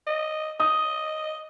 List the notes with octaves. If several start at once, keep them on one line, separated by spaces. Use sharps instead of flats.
D#5
D#5 D#6